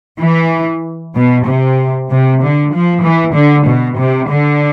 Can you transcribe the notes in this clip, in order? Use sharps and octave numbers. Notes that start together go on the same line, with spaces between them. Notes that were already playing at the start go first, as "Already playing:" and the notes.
E3
B2
C3
C3
D3
F3
E3
D3
B2
C3
D3